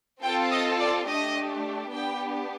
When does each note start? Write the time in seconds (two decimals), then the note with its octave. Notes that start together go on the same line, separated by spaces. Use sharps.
0.22 C4 F4 A4 G5
0.51 D#5
0.80 D5
1.07 A3 D4 G4 D#5
1.91 B3 D4 G4 G5